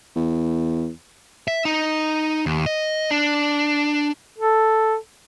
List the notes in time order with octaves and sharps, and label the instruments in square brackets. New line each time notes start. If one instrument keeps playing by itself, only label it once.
[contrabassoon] E2
[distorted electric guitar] E5
D#4
D#2
D#5
D4
[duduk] A4